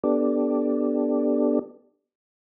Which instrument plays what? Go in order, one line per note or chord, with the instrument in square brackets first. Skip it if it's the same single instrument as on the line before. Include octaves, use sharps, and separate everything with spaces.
[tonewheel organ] B3 D4 G4 A4 D5